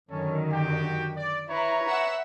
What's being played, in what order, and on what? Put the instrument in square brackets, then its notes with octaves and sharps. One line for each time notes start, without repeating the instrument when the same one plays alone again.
[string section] F#2 D3 D#3 [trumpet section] C#4 A4 C#5
[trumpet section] F#4 G4 G5
D5
[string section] E4 [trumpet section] B4 C#5 A#5
[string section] E5 F#5 E6